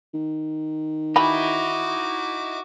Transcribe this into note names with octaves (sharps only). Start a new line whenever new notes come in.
D#3
E3 D#4 E4 F#4 G5 B5 D6